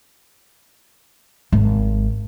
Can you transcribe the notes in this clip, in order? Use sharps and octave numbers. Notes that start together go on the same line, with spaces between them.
G#1